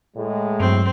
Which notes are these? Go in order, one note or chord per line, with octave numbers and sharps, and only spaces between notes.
A2 G#3
G2 F#3 C4